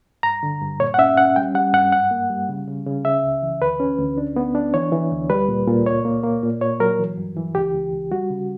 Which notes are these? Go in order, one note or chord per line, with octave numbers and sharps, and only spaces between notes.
G2 A#5
D3
G2
A#2 C#5
F#5
C#4 E5
C#4 F#5
G3 G5
G3 F#5
G2 F#5
F#2 F#5
A#3
G3
C#3
C#3
C#3
C#3 E5
C#2
E3
D2 B4
C#4
D2
D4
B3
D4
E3 C#5
E3
D2
G3 B4
A#2
A#2
C#2 C#5
A#3
A#3
A#2
A#2 C#5
F#3 A#4
E3
G2
E3
C#2 G4
C#2
C#2
G3 F#4
C#3